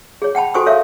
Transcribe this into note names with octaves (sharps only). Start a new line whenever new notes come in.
G#4 C#5
F#5 G5 A5 B5
F#4 A4 C5 G#5 C#6 D#6
A4 A#4 C#5 E5 F5